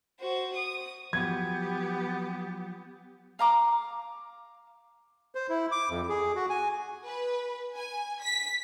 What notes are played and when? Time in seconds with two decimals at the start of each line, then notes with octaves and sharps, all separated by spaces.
0.20 F#4 C5
0.56 D#6
1.13 F3 F#3 B3 G4 G#6
3.39 F5 A#5 D6
5.35 C5
5.49 E4
5.72 D6
5.90 F2
6.09 G#4
6.35 F#4
6.50 G#5
7.06 B4
7.75 G#5
8.21 B6